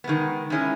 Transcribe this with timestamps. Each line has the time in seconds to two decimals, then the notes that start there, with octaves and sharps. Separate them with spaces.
0.04 D#3 G#3 B3
0.50 D#3 G#3 C#4 E4